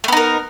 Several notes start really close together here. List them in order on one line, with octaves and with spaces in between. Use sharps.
A3 B3 D#4 A#4